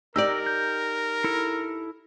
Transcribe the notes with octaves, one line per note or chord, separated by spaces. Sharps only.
D#4 G4 A#4 D5 D#5 E6
G6
E4 A4